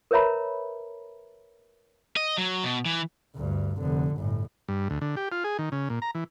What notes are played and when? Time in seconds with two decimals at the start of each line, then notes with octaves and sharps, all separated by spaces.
0.11 A#4 B4 C#5 E5 A#5 B5
2.17 D#5
2.38 F#3
2.64 B2
2.85 E3
3.36 D2 G2
3.78 F1 D3
4.16 G1 A2
4.68 G2
4.90 D2
5.01 D3
5.17 G4
5.32 F4
5.44 G#4
5.59 D#3
5.72 C#3
5.90 A#2
6.02 A#5
6.15 E3